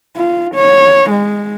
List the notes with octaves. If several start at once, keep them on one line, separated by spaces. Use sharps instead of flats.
F4
C#5
G#3